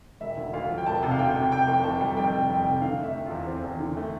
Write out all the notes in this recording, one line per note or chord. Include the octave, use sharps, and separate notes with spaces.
E1 E5
D2
D2 F5
F3
G5
E1 A5
C3
F5
D2 G5
C3
C3 G5
F1
G5
F1 A5
G3
F2 G5
C3
F2 G5
C3
D3 F5
A3 E5
A3
E2 F4
C4
E2
D3
A3